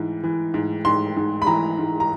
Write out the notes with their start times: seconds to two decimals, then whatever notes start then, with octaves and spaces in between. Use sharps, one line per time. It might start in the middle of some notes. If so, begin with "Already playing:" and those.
Already playing: G#2 E3
0.23 E3
0.54 G#2
0.85 G#2 C6
1.17 G#2
1.42 B5
1.47 E3 A#5
1.79 G#2
2.00 A#5